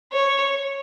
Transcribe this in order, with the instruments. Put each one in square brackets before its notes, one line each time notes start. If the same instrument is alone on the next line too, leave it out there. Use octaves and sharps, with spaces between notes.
[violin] C#5